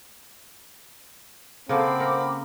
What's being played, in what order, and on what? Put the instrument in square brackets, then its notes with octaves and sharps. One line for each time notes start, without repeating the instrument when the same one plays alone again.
[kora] C#3 A#3 A4 [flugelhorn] C4 [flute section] F#5 B5 D6
[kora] A#4